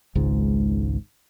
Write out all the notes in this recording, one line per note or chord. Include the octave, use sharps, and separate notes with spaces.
G#1 C#2 G#2